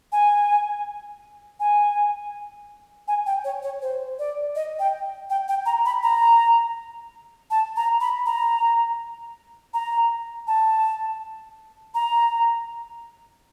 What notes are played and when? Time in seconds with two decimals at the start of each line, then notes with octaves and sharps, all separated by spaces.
0.12 G#5
1.60 G#5
3.08 G#5
3.26 G5
3.44 C#5
3.63 C#5
3.82 C5
4.19 D5
4.55 D#5
4.79 G5
5.30 G5
5.48 G5
5.66 A#5
5.85 B5
6.03 A#5
7.51 A5
7.76 A#5
8.01 B5
8.26 A#5
9.74 A#5
10.47 A5
11.94 A#5